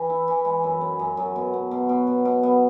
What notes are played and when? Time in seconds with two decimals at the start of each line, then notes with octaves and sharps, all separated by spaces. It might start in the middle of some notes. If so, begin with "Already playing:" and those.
Already playing: E3
0.10 E4
0.28 E3
0.45 G#3
0.64 F#2
0.81 C#4
0.99 F#2
1.17 F#2
1.36 B2
1.54 B2
1.71 B2
1.89 B2
2.07 B2
2.25 B2
2.43 B3